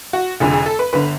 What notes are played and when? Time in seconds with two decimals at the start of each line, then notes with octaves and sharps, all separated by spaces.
0.13 F#4
0.40 F1 F2 D3 G#4
0.53 G#4
0.66 A4
0.79 B4
0.93 G1 D3 B4